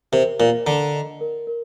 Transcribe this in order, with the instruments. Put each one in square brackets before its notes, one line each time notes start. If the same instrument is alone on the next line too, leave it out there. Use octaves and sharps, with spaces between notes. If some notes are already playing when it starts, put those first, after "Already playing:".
[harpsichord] C3 [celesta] A#4
[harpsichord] A#2 [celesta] A#4
[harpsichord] D3 [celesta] A#5
[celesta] D#5
A#4
A#4